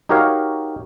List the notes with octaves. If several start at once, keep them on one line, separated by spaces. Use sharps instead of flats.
D#4 F#4 G4 A#4 C#5 F5